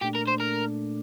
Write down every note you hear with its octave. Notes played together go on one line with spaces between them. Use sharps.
A#2 A3 D4 G4
A#4
C5
A#4